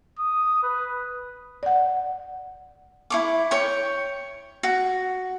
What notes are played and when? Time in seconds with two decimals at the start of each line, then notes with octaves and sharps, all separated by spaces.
0.19 D#6
0.63 B4
1.63 D5 F#5
3.10 E4 C#6 D6
3.51 C#5 G5 C#6
4.63 F#4